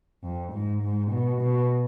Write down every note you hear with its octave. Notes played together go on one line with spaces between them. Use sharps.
F2
G#2
G#2
B2
B2